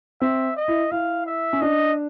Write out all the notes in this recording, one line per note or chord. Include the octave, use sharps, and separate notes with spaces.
C4 E5
D#5
E4
E4 F5
E5
C#4
D4 D#5